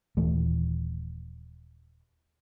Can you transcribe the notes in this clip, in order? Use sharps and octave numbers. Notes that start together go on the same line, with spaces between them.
D#1 E3 A3